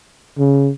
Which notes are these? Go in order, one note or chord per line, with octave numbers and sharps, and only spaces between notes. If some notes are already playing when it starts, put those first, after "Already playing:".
C#3